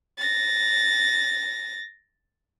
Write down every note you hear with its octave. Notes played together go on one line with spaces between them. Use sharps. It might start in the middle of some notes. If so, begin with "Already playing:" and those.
A6 A#6